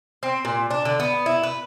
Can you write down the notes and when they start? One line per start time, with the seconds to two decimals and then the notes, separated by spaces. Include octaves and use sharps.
0.23 C4
0.45 A#2
0.71 D4
0.85 D3
1.00 B3
1.26 E4
1.43 B4